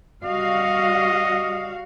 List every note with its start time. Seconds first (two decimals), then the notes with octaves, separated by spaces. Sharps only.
0.24 G3 F#4 D#5 F5